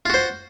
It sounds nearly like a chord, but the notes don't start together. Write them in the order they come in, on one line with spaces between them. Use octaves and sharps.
F4 F#4 C5